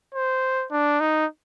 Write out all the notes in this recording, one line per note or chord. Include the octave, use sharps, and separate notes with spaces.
C5
D4
D#4